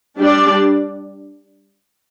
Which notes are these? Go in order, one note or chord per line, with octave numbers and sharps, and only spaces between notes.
G3 D4 G4 D5